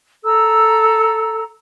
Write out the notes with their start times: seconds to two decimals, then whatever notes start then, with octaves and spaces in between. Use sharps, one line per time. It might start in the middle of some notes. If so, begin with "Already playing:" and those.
0.24 A4 A#5 E6